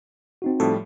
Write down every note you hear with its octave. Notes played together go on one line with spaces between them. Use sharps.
C4 D#4 F#4
A2 F3 G3 A4 E5